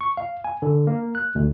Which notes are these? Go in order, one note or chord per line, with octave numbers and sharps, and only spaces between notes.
C#6
F5
G#5
D3
A#3
F#6
D2